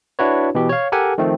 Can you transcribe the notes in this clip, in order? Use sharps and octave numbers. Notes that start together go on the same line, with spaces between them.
D4 E4 F#4 B4 C#5
B2 E3 G4
C#5 F5
G4 A4 A#4 F#5 G#5
D#3 F3 A3 C4